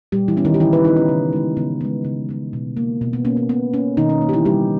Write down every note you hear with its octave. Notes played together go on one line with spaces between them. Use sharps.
A#2 G3 G4
E3 E4
G3 B3 C#4
D#3 D#4
G4
C#3 E3 E4
B3 B4
D#3 G#3 B3 D#4
C#4
C#3
G#3 B3
C#3 B3
G#3 B3
C#3
G#3 B3
B2
A#3
B2
B3
A#3 C#4
C#4
B2 B3
A#3 C#4
B2 D#3 D#4
C#4
A#3
G4
E3 E4
C#3 G3 G4